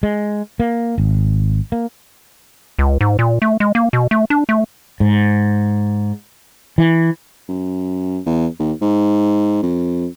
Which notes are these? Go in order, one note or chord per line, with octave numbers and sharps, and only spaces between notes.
G#3
A#3
G#1
A#3
C#2
G#2
A#2
A3
G#3
A#3
B2
A3
D4
A3
G#2
E3
F#2
E2
D#2
G#2
F2